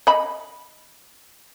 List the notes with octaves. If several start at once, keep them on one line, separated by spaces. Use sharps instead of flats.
D#5 B5